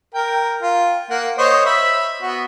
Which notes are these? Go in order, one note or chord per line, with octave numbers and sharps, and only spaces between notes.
A#4 G5
F4
A#3 F#5
C5 C#5 D#5
E5 B5
B3 F#4